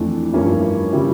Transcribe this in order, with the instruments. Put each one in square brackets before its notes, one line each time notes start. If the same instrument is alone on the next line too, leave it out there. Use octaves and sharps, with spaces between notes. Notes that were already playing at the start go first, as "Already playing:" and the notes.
Already playing: [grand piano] F2 E3 A3 D4
G2 F3 A#3 C#4 E4
C#3 G3 C#4 E4